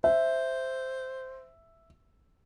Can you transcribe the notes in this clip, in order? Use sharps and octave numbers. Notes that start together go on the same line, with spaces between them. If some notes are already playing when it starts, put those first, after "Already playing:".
C5 E5